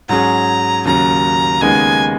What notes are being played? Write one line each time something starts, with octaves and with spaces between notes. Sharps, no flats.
G#2 F#3 C#4 G#4 A#5
D#2 C#3 F#3 A#5
D#2 C#3 G#3 B3 D#4 G#5